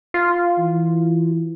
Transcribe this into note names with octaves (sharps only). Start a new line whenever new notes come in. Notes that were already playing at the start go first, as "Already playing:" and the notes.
F4
E3